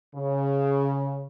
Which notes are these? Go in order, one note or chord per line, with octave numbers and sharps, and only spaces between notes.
C#3